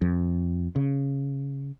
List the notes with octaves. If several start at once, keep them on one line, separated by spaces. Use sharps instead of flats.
F2
C#3